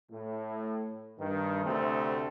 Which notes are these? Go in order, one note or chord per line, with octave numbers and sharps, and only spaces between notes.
A2
G2 D#3
D2 C3 A3 C4